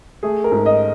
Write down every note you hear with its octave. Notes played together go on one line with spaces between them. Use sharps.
A3 G#4
A#4
G#2
D#5